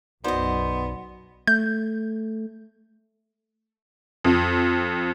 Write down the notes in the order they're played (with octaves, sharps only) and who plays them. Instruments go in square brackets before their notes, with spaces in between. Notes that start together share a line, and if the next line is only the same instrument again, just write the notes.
[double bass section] B1 F#2 [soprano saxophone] B3 [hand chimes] D#4 F#4 D5 [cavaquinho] C5 D#5
[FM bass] A3 [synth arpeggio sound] G6
[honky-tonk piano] F2